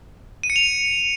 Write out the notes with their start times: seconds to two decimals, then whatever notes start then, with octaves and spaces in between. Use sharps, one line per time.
0.43 D#7
0.50 C#7
0.56 F7